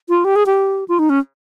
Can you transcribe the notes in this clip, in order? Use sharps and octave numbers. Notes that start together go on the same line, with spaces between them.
F4
G4
G#4
G4
F4
D#4
C#4